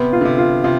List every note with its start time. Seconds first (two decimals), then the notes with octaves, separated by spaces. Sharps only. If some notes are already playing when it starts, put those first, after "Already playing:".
Already playing: C3 B3
0.13 F4
0.21 D3
0.25 C3
0.38 F4
0.64 C3 F4